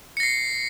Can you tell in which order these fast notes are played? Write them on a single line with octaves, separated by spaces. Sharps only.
C#7 A#6 C7